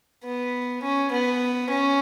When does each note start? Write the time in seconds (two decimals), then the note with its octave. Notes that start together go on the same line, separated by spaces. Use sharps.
0.24 B3
0.83 C#4
1.11 B3
1.70 C#4